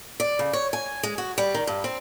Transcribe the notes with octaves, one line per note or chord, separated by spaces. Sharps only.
D5
C#3
C#5
G#5
G#3
F#4
G3
D#3
G2
C4